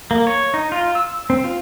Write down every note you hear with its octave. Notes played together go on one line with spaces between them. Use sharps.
A#3
C#5
D#4
F4
E6
C4
F4